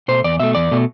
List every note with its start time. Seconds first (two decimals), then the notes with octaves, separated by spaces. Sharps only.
0.08 B2 A3 C5
0.24 E2 D5
0.40 B2 A3 E5
0.55 E2 D5
0.71 B2 A3